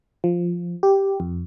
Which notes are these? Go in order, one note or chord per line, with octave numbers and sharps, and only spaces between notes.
F3
G4
F2